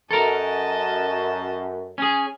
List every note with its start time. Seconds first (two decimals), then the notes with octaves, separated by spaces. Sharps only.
0.11 F#2 A4 A#4 D#5 A5
1.98 C#4 G#4